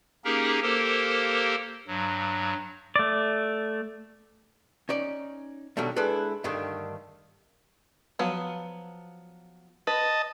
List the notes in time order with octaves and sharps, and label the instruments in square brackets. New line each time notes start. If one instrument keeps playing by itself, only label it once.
[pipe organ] A#3 C#4 D#4 G4 G#4 A#4
A#3 G4 A4 A#4 C5
G2 F#3
[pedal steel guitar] A3 D5
[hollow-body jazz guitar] C#4 D#4 D5
B2 D3 D#3 F#3 G3 A3
G#3 D4 E4 A4 B4 D5
G2 D3 D#3 A3 D4
[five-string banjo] F3 F#3 B3
[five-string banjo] B4 [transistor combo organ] D#5 A5